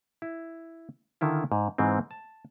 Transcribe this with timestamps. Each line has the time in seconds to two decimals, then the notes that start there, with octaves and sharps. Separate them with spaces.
0.22 E4
1.21 D3 D#3 E4 F4
1.52 G#2
1.78 G#2 E3 G#3 C4
2.11 A5